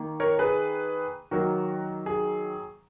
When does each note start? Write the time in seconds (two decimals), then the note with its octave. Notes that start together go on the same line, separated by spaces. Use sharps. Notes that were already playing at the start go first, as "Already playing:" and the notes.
Already playing: D#3 A#3
0.20 A#4 C#5
0.39 G#4 B4
1.31 D#3 F#3 A#3 F#4 A#4
2.06 G#4